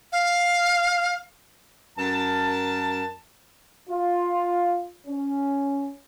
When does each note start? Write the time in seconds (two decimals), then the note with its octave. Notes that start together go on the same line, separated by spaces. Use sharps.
0.12 F5
1.98 F#2 A#4 A5
3.89 F4
5.07 C#4